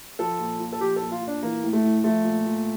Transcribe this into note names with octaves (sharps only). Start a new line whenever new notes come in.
F3 A4
A#2
A#2
A4
F3 G4
A#2 A4
F4
A#2
D4
E3 A#3
A2
A3
A2
F3 A3
A#2
A#2